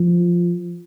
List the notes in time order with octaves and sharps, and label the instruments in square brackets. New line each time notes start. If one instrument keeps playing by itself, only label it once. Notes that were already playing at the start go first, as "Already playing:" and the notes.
Already playing: [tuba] F3